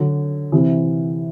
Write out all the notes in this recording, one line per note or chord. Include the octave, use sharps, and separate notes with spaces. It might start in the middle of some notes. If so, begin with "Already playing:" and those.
Already playing: D3 F#3
C3 E3